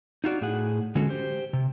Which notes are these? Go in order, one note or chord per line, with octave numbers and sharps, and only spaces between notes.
D#4 F4 F#4 D5
A2 G#4 F#5
D3 G#3 C#4 F#4 A4
G4 C5
C3